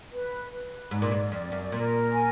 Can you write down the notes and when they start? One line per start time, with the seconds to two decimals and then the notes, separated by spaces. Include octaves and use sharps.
0.12 B4
0.52 B4
0.91 G#2 D5
1.02 A#2
1.11 G#2
1.32 F2 D5
1.52 F#2
1.71 A#2 A#4
2.12 G#5